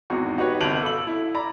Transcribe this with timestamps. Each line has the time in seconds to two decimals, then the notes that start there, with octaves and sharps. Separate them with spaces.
0.10 G#1 E2 D#4 F#4 C#6
0.37 D#4 F#4 G4 B4 C#5
0.60 G1 C2 A5 D7 F7 F#7
0.82 A4 F5 B5 E6 F#7
1.07 E4
1.34 D5 A#5 B5